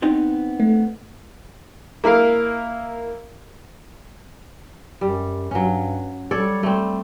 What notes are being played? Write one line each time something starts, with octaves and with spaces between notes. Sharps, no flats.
B3 C4 D#4
A3
A#3 E4 A#4 F5
F#2 G3
G2 F#3 C#4
G3 A4 C#5 D5
G3 A3 C4